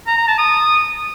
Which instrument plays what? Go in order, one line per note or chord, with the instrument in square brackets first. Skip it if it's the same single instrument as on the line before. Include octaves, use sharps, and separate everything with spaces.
[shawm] A#5
A#5
A5
D#6